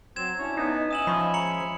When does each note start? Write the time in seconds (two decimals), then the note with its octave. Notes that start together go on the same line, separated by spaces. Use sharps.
0.16 F#3 C4 G#6 E7
0.39 C#4 D4 E4 C#5
0.57 B3 D#4
0.91 C#4 D#5 E5 G#5 D#6 E7 F#7
1.07 F3 B5 C#6
1.34 G#3 A#5 C#7 F#7